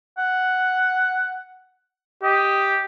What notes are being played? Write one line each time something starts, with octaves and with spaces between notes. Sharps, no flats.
F#5
G4 D#5